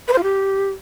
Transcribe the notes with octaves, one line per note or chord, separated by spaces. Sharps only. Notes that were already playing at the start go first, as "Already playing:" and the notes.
B4
C5
F4
G4